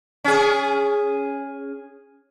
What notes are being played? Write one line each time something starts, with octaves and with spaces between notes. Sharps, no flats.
C#4 G#4